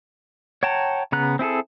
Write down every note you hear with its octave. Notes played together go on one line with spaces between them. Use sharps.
C#5 F#5 G5 A5 A#5
C#3 B3 A#5 F#6
C4 E4 G#4 A4